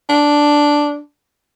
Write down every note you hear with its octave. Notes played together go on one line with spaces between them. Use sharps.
D4